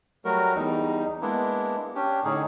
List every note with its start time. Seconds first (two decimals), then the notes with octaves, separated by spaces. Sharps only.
0.25 F#3 G3 A3 F#4 A#4
0.55 E2 G3 D#4
1.22 G#3 A#3 B3 D4 E4
1.95 C#4 D4 G4
2.24 A2 D3 C#4 D#4 G#4